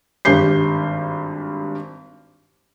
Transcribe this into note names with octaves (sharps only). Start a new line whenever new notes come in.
G#1 G2 G3 G6 C7